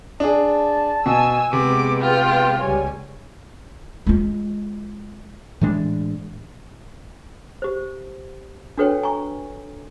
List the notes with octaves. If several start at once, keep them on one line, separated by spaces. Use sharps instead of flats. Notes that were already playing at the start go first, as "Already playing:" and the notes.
D4 G#4 A5
B2 G#5 E6
C3 G#3 B3 D6
F4 G5
C#2 G3 C#5 G#5
G#3 F4
A2 E3 G#3 D4
G4 C5
D4 F#4 A4 B4 C#5 G5
G#5 A#5 C#6